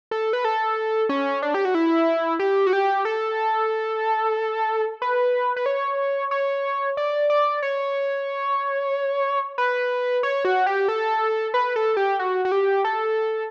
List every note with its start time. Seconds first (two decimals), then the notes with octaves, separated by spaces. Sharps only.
0.11 A4
0.33 B4
0.45 A4
1.09 C#4
1.42 D4
1.54 G4
1.65 F#4
1.75 E4
2.39 G4
2.67 F#4
2.73 G4
3.05 A4
5.02 B4
5.56 B4
5.66 C#5
6.31 C#5
6.97 D5
7.30 D5
7.62 C#5
9.58 B4
10.23 C#5
10.45 F#4
10.67 G4
10.88 A4
11.54 B4
11.76 A4
11.97 G4
12.19 F#4
12.45 F#4
12.52 G4
12.84 A4